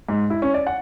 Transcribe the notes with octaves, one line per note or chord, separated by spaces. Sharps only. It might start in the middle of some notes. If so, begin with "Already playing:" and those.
G#2
E4
C#4
D5
F#5